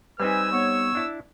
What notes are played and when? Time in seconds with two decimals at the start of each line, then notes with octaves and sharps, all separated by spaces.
0.20 G3 C4 D#4 B4 G#5 E6
0.51 B3 C#5
0.95 D4 E4 A5